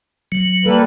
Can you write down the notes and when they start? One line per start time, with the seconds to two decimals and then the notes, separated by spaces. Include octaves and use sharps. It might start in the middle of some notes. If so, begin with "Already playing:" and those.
0.32 F#3
0.65 G3 A#3 A4 B4